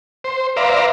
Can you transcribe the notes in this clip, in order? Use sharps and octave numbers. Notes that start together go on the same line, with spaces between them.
C5
B4 C5 D5 E5 F5 A#5